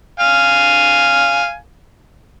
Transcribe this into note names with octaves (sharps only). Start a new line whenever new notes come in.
F5 G#5